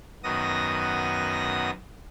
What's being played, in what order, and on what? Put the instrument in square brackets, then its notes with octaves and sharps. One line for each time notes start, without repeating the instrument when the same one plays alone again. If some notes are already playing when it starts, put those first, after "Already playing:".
[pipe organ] F#2 D#3 B3 F#4 D#6 A#6